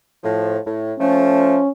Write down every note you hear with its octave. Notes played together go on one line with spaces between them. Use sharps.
A2 F3
A2
F3 A3 C#4